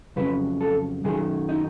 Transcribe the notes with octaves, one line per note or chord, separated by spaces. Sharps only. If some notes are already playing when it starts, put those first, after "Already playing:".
F2 C#3 F#3 B4
A4
F#2 D#3 F#3 G#4
D#4